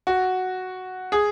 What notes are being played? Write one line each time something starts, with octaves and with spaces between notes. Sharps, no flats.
F#4
G#4